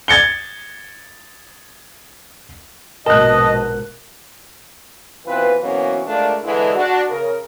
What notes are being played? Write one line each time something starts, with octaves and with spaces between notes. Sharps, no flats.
G#6 A6 C#7 G7
A#1 G#2 B2 A#4 D#5 A5 F#6
B2 E3 C4 F4 B4
B2 E3 F#3 A#3 C4 C#4
G#3 A3 D4 F4 A#4 D5
D3 E3 G#3
D4 F#4
C#3 A#4